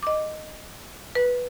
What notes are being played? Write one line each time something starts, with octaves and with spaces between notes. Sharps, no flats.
D#5 D6
B4